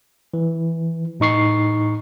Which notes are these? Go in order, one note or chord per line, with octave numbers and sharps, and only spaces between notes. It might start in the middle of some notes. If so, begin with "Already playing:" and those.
E3
A2 D#4 C#6 C7